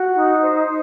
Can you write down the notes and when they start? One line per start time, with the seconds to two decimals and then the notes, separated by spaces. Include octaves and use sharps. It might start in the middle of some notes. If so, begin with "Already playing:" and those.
Already playing: F#4
0.14 D#4
0.40 C5
0.65 D#4